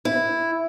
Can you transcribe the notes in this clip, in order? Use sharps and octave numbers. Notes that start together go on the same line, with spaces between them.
E4